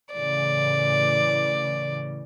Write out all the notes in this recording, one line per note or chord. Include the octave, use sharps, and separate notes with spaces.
A2 C#3 E3 D5